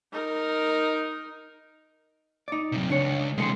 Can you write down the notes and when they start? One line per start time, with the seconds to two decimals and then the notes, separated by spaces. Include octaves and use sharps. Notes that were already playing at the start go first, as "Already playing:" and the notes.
0.12 D#4 A#4
2.48 D#4 D5
2.72 F#2 C3
2.90 C#2 D4 C#5
3.38 C3 E3 G#3 A4 C6